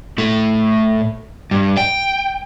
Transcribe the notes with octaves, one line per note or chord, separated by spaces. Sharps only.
A2 A3
G2
G5